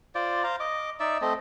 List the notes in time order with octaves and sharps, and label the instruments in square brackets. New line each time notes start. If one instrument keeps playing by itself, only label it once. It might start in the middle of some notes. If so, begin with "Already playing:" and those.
[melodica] F4 C5 D5
C5 F5 A#5
D#5 D6
D#4 D5 E5
A3 C4 D#5